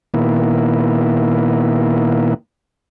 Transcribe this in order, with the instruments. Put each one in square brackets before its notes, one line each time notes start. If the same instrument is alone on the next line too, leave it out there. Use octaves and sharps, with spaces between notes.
[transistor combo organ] A#2 D#3 A#3 B3 E4